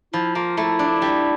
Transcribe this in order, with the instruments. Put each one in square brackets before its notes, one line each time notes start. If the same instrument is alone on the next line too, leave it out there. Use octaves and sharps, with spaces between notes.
[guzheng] F3 [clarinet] E4
[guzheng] A#3 [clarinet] F4
[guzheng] A3 [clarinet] E4
[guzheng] D4
G3